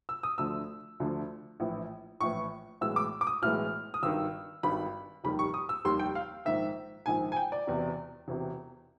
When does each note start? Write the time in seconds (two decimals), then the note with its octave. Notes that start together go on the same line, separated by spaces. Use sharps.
0.09 E6
0.23 D#6
0.38 D2 D3 F3 A3 E6
1.00 D2 D3 F3 A3
1.60 A#1 A2 E3
2.21 A#1 A2 E3 C#6
2.81 B1 A2 E3 G#3 E6
2.96 D6
3.21 D6
3.27 D#6
3.42 B1 A2 E3 G#3 F6
3.94 D#6
4.03 G#1 G2 D#3 E6
4.63 G#1 G2 D#3 B5
5.24 F1 D#2 D#3 G3 B5
5.39 C#6
5.54 D#6
5.69 E6
5.85 F1 D#2 D#3 G3 C6
5.99 G5
6.15 F5
6.45 A#1 G#2 D#3 E5
7.06 A#1 G#2 D#3 G#5
7.32 G#5
7.37 G5
7.52 D5
7.67 E1 E2 C3
8.28 E1 E2 C3